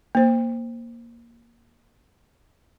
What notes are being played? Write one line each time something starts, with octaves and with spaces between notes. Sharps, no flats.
A#3 C5